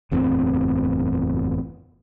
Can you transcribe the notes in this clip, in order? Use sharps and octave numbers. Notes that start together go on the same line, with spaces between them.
F#1 E2 A2 C4